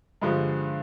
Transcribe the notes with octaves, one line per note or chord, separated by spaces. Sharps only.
G2 D3 F3 G#3